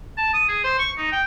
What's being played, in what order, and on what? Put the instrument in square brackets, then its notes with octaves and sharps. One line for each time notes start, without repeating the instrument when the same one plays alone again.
[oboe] A5
D#6
G#4
C5
C#6
D#4
G5